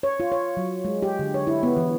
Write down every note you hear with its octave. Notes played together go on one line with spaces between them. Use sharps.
C#5
F4
C#5
F#3
G#3
G4
D3
C#5
E4
B3
E3